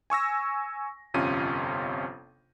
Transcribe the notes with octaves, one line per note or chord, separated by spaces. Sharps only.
G#5 C#6 E6 A#6
G1 F2 C3 C#4 F4 D#7